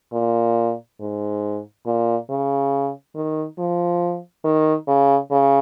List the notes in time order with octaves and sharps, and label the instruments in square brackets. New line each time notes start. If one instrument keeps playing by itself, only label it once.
[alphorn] A#2
G#2
A#2
C#3
D#3
F3
D#3
C#3
C#3